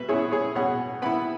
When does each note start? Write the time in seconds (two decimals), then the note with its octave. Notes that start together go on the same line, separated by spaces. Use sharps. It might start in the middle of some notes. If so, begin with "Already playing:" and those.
Already playing: B2 B4 E5
0.08 B3 E4 G#4 C#5
0.32 G#4 C#5
0.55 B2 C#5 F#5
1.02 B3 E4 F#5 B5